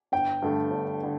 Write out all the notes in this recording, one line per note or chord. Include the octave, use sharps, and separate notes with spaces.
G1 G5
G2 D3 A3
G1
D3